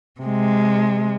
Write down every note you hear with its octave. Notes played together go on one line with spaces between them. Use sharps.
C3 G#3